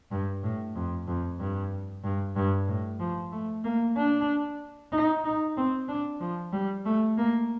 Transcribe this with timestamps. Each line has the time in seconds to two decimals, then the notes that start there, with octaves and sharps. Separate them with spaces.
0.11 G2
0.43 A2
0.75 F2
1.07 F2
1.39 G2
2.03 G2
2.36 G2
2.68 A2
3.00 F3
3.32 A3
3.64 A#3
3.96 D4
4.92 D#4
5.24 D#4
5.57 C4
5.88 D4
6.20 F3
6.52 G3
6.85 A3
7.17 A#3